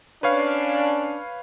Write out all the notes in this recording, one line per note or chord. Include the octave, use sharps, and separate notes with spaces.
C#4 D4 B4 C#5 F5